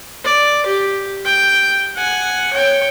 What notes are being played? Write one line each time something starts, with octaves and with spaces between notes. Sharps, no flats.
D5
G4
G5
F#5 G#5
C#5 G5